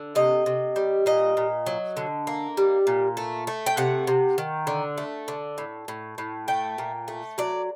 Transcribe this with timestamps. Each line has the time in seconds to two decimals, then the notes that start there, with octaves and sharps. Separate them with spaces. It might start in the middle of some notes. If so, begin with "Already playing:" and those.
Already playing: D3
0.15 C3 D#5
0.46 C3
0.76 G3
1.06 A#2 D#5
1.37 A#2
1.66 F#3
1.97 D3
2.27 A#3
2.57 G3
2.87 A#2
3.17 A3
3.47 A3
3.66 G5
3.77 C3 F#5
4.07 C3
4.38 D#3
4.67 D3
4.98 A3
5.28 D3
5.58 A2
5.88 A2
6.18 A2
6.48 A3 G5
6.78 A#2
7.08 A3
7.38 F#3 D5